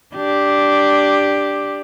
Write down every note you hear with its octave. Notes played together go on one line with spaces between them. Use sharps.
D4 G4